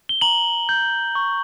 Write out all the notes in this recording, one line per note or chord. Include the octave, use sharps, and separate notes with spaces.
G7
A#5 F#7
G6
C#6